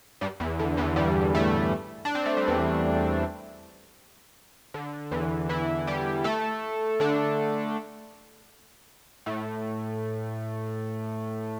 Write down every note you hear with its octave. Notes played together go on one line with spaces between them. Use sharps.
G2 G3
E2 E3
D3
E2 E3
G2 G3
A2 A3
D4
C4
A3
G3
E2 E3
D3
E2 E3
E3 E4
G3 G4
A3 A4
D3 D4
A2 A3